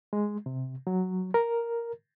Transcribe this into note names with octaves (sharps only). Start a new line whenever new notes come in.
G#3
C3
F#3
A#4